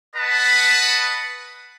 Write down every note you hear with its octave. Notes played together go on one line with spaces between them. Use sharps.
B4 D#5 F#5 A5 B5